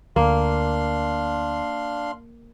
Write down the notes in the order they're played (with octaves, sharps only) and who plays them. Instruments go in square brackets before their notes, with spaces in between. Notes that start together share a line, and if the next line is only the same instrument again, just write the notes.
[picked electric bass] D2 [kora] A#3 [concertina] D4 F5 C6